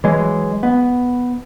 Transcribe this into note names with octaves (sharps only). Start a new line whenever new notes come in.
E3 F#3 G#3
B3